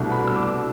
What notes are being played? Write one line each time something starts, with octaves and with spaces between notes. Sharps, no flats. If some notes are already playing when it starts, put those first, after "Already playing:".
Already playing: C2 B2 A3 D4
B5
E6
D6